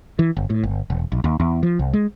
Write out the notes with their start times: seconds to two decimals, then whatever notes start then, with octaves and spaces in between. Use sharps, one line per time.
0.19 E3
0.37 G1
0.50 A2
0.63 G1
0.90 E1
1.12 B1
1.24 D#2
1.40 E2
1.63 F3
1.79 C2
1.93 G#3